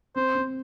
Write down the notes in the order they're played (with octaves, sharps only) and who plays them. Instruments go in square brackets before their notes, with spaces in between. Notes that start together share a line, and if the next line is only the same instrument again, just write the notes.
[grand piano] C4 [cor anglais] C5
[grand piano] C4